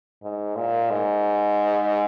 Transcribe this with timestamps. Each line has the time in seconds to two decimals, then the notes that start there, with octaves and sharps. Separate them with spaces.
0.23 G#2
0.56 A#2
0.90 G#2